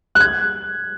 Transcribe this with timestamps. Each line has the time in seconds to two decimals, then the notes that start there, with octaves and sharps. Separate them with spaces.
0.15 F#6
0.20 G#6